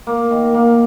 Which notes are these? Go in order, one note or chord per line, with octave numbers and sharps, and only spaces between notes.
A#3
D#3
A#3